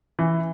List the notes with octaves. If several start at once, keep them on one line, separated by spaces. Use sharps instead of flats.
E3